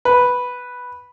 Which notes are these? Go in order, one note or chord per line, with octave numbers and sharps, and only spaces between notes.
B4